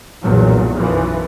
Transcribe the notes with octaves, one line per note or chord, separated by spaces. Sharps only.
B1 E2 G2 A#2 F#3
B1 F#2 E3 F3